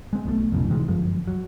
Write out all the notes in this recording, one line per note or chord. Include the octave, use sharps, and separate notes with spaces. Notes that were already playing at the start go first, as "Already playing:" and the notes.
G#3 C4
B1 B2 E3 A3
F1 B1 F#2 A2
C3 D#3 E3 G#3
G1 F#2 F3 G#3
F#3